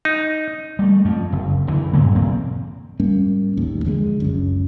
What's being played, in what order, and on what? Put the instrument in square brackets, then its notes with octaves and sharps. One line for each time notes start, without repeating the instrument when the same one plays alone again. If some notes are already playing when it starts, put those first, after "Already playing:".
[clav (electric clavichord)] D#4
[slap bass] G3 A3
F2
F#1
F#1 D3 E3
G2 A#2 F#3 A#3
B1 E2 A#3 C4
[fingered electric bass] G#2 G3 A#3 C#4
D1 A1 D#2
F2 D3 G3 G#3
F#1 C#2 F#2